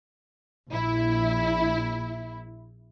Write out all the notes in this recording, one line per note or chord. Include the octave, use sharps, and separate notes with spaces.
A#1 E4